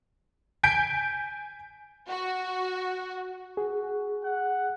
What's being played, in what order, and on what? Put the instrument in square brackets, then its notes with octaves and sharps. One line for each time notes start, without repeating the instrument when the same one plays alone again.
[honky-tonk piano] G#5 G6 B6 D7
[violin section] F#4
[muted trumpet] F#4 [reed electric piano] G#4
[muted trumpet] F#5